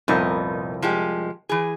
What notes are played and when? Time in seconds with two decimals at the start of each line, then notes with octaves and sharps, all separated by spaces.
0.08 C2 F2 A#2 B3 D#4
0.82 F3 G#3 G4
1.49 E3 G#4